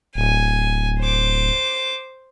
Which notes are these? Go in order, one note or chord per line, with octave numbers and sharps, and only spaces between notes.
D1 G#5
C5 D6